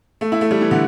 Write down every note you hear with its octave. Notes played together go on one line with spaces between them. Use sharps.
A3
E4
A3
G3
E3
D3